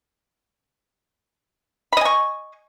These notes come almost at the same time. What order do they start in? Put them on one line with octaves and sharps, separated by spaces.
B5 D#5 G#5 C#6